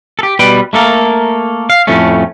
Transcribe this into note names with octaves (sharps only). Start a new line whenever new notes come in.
G4 A4
B2 G3 B4 G5
A3 A#3 A4 A#4
F5
F2 A2 A3 C#4